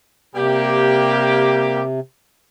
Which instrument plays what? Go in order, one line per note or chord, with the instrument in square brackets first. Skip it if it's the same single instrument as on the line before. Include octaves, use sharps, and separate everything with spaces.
[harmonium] C3 [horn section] G3 A#3 G4